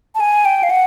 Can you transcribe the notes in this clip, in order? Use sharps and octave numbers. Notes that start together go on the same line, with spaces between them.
A5
G#5
G5
F5
F#5